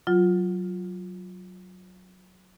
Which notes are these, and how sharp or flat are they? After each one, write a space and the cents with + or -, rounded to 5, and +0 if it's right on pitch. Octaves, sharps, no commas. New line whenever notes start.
F#3 +0 F4 +10